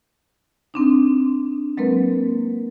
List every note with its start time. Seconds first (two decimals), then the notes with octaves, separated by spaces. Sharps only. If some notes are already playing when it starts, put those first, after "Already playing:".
0.74 C4 D4 D#4
1.77 F#3 G#3 A#3 C4 A#4 B4